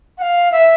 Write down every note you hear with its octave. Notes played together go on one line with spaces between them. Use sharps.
F#5
F5
E5